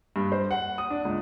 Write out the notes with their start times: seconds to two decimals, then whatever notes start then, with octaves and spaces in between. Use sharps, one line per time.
0.16 G2
0.32 C5
0.51 F#5
0.78 D#6
0.90 D4
1.05 C#2